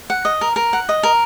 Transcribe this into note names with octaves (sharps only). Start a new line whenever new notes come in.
F#5
D#5
A#4
A#4
F#5
D#5
A#4